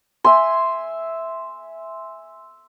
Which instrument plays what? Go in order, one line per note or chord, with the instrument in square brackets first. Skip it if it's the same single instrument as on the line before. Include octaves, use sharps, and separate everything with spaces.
[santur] E5 G#5 C6